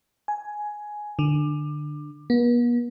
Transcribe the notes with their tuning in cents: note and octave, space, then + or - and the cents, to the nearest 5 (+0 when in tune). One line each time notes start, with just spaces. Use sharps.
G#5 +10
D3 +20
B3 -45